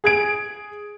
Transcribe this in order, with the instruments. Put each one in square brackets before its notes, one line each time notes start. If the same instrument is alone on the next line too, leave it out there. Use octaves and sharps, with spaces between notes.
[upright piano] G#4 G#6 D7